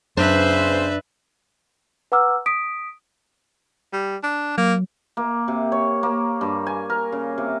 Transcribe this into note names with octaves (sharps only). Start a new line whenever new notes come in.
F#2 C#3 B3 D4 B4 C5 E5
B4 F#5 A#5 D6 E6 F6
D#6 B6 D7
G3
D4
F#3 A#3
A#3
C3
C#5
A#3
G2
G#5
A#4
C#3
C3